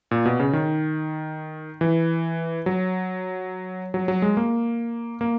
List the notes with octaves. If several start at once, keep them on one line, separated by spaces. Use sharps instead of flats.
A#2
B2
C#3
D#3
E3
F#3
F#3
F#3
G#3
A#3
A#3